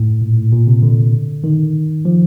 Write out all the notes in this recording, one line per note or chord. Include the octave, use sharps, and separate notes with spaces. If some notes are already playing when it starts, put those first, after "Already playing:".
Already playing: A2
A#2
A2
A#2
C3
D3
D#3
F3